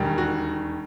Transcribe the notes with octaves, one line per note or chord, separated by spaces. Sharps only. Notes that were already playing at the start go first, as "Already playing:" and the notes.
Already playing: E1 D#2 D#3 G3
F#4